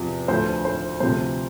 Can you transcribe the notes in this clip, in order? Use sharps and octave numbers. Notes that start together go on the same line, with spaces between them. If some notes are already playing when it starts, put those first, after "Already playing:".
Already playing: E2 C3 F3
D2 D3 F3 C5
C5
D2 C3 F3 C5